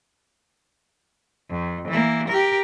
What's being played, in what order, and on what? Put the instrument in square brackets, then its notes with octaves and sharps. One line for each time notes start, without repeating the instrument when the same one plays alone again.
[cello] F2
E3 A#3
G4 A#4